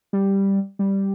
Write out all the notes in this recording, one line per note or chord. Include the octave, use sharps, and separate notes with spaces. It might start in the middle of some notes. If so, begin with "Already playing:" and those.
G3
G3